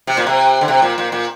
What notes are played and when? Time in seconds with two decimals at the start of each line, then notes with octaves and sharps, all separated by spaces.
0.07 C3
0.17 A#2
0.27 C3
0.61 D3
0.68 C3
0.82 A#2
0.98 A#2
1.12 A#2